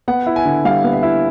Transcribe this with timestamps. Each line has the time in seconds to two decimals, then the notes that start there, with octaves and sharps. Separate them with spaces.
0.08 B3 F#5
0.26 E4
0.36 G#5
0.45 D3
0.65 G3 F5
0.84 B3
0.93 E5
1.03 E4